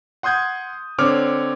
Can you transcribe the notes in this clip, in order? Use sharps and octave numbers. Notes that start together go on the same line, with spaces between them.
F#5 C6 D#6 G6 G#6
D3 C4 C#5 D6 F6